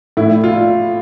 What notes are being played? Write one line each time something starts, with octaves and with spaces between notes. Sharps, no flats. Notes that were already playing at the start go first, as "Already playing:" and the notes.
A2 E4
F4